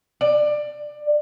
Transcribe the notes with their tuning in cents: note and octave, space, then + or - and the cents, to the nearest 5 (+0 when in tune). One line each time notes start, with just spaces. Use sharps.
D5 +20